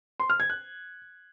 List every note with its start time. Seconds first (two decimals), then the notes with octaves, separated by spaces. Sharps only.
0.20 C6
0.30 F6
0.40 G#6
0.50 F#6